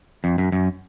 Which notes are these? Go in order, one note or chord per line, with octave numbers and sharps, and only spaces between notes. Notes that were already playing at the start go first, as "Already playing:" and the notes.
F2
F#2
F#2